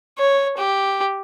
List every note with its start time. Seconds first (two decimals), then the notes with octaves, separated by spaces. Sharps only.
0.18 C#5
0.57 G4